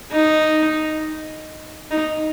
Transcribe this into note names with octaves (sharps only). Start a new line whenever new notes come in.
D#4
D#4